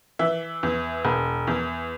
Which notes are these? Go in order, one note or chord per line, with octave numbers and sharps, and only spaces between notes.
E3 E5
E2
E1
E2